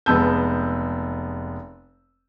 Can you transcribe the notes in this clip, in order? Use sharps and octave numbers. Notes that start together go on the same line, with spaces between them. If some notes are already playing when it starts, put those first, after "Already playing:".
F1 G#3 B3 A5 E6 G6